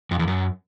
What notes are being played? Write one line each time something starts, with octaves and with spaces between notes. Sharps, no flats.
F2
E2
F#2